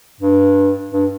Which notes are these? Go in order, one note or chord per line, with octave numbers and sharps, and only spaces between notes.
G2
G2